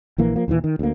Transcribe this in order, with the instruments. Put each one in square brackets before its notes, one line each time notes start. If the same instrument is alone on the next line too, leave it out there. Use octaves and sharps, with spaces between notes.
[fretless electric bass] A#1 E3 A#3
F3 A#3
D#2 A#2 E3
D#3
D2 A#3